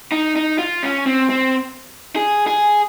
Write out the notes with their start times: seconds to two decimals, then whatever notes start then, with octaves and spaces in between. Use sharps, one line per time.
0.12 D#4
0.36 D#4
0.59 F4
0.83 C#4
1.06 C4
1.30 C4
2.16 G#4
2.47 G#4